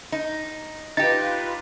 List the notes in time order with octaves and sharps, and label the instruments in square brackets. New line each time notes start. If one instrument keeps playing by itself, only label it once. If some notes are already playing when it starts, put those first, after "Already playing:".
[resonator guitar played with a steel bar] D#4
[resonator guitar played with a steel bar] D#4 G4 [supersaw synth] F4 B4 [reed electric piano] A6